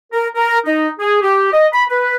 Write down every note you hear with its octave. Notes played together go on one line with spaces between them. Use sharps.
A#4
A#4
D#4
G#4
G4
D#5
B5
B4